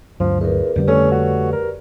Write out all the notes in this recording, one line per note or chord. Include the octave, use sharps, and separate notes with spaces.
D2 G2 F3 F#3
E2 A#4 B4
F2 D3 G3 G4 B4 D5
A3 C#4 C#5
F#4
A#4